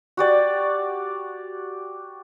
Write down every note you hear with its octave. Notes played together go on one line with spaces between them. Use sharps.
F#4 G4 D5